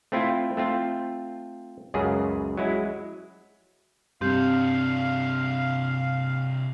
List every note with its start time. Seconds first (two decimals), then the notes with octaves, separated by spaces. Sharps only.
0.12 A3 C4 E4 F4
0.57 A3 C4 F4
1.94 C#2 F#2 C#3 G#4
2.57 F#3 G#3 E4
4.21 G2 C3 C4 D4 G4 F5